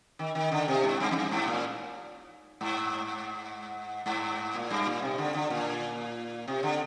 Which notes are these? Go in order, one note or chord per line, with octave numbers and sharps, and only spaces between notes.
D#3
D#3
D3
C3
G#2
G2
F2
G2
G#2
A#2
G#2
G#2
A#2
G2
A#2
C3
D3
D3
A#2
C3
D3